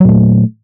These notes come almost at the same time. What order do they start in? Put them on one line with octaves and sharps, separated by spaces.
F#3 A#2 A3